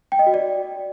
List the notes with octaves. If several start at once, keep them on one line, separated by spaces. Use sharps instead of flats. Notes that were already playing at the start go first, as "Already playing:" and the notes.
G5
D#5
F#4
D5